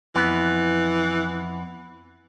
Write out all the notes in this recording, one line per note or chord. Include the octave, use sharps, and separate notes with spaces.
F2 E3 B3